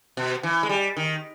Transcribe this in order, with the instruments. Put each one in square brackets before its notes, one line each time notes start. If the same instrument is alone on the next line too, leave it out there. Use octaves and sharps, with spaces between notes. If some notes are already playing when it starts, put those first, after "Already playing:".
[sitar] B2
E3
G#3
G3
D#3